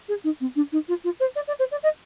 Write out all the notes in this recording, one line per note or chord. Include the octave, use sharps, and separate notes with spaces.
G#4
D#4
C4
D4
D#4
F4
F4
C5
D5
D5
C5
D5
D#5